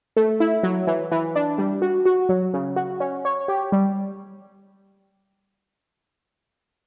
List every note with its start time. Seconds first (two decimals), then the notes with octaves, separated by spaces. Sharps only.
0.17 A3
0.40 E4
0.63 F#3
0.87 E3
1.12 E3
1.36 D4
1.58 G3
1.82 F#4
2.06 F#4
2.29 F#3
2.54 C#3
2.76 F#4
3.00 C#4
3.25 C#5
3.48 G4
3.72 G3